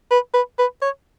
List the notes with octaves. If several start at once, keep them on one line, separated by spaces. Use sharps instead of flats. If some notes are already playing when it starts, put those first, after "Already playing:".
B4
B4
B4
C#5